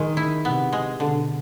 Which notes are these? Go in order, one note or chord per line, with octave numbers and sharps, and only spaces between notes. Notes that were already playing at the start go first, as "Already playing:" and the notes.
Already playing: D#3 G#3
E4
C3 B3
G#3
B2 D3